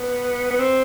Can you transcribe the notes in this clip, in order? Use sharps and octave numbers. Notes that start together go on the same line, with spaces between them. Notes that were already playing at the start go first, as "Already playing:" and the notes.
Already playing: B3
B3
C4